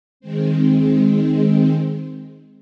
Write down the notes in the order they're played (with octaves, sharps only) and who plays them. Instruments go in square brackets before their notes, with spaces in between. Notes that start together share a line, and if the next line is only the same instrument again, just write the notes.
[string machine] D#3 G#3 C4